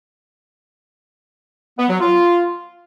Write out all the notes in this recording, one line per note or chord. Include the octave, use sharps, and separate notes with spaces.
B3
F#3
F4